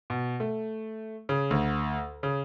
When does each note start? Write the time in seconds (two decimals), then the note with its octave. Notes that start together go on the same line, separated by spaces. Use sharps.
0.10 B2
0.40 A3
1.29 C#3
1.51 D2
2.23 C#3